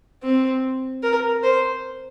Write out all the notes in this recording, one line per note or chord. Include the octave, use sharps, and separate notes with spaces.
C4
A#4
C5